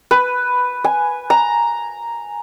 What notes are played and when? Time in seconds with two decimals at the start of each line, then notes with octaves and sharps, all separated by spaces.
0.11 B4
0.84 G#5
1.30 A#5